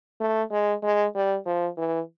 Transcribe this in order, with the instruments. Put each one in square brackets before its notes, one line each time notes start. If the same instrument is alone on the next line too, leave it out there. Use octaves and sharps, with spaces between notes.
[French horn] A3
G#3
G#3
G3
F3
E3